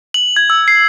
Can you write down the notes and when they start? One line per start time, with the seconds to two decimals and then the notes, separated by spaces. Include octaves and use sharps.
0.14 F#7
0.36 G#6
0.50 E6
0.68 C7